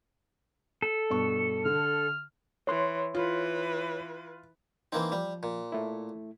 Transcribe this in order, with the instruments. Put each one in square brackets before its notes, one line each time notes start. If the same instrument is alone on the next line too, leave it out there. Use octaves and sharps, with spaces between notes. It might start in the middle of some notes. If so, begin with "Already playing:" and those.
[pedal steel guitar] A4
[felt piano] G2 B2 C#6
[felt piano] D3 [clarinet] F6
[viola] E3 [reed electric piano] C#5 C6
[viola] E3 B4 [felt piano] F4
[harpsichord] E3 A#3 C4 [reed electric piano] D#4
[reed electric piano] F3 [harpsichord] G3
[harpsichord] A#2
[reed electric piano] A3 E4